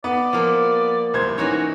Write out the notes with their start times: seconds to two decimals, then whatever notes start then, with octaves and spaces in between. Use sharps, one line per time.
0.04 B3 D5
0.33 F3 A#3
1.14 C2 C5 G#6
1.38 E3 C#4 D#4 F#4 C#5